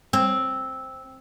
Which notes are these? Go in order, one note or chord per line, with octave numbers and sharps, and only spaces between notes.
C4